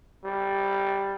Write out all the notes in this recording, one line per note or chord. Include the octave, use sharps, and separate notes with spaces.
G3